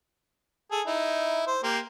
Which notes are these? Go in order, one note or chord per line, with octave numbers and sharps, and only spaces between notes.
G#4 A4
D#4 E4
C5
A#3 G4